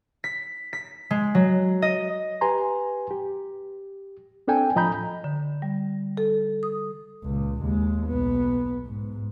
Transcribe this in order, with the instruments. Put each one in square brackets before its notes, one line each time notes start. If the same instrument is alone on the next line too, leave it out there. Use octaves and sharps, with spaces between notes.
[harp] B6
B6
G#3
F#3
D#5
[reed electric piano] G4 B4 G#5 A#5 C6
G4
C4 D4 A4 G5 G#5
A2 F3 D#5 A#5 B5 G6
[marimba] D3
G3
A4
D#6
[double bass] C#2 A#2
D#2 G#3
B1 B3
G#2